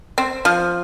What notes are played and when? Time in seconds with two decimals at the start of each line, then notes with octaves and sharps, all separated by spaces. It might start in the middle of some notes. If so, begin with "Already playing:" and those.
0.18 C4
0.45 F3